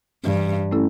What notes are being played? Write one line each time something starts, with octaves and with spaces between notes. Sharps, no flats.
G2 E3
A3 C#4 E4 A4